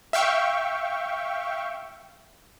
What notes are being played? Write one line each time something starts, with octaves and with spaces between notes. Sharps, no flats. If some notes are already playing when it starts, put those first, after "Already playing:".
E5 F5 G5 C#6